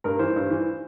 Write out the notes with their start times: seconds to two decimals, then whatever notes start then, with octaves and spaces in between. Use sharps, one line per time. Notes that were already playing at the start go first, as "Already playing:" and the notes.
0.04 G2 A#4
0.19 E3 C5
0.36 G2
0.51 E3